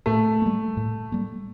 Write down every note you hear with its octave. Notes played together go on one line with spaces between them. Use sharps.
A2 A3
G3 A#3
A2
G3 A#3